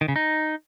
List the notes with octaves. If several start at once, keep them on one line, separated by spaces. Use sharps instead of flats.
D#3
C#3
D#4